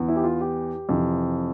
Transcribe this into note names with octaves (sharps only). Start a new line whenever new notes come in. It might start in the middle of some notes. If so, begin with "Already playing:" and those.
Already playing: E2 E3
E4
G4
F4
G4
F2 C3 E3